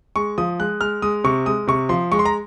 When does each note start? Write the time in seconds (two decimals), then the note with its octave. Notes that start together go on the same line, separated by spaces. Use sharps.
0.16 G#3 C#6
0.38 F3 D#6
0.59 G#3 F#6
0.81 G#3 F6
1.02 G#3 D#6
1.24 C3 C#6
1.46 G#3 D#6
1.67 C3 C#6
1.89 F3 C6
2.12 G#3 C#6
2.19 C6
2.25 A#5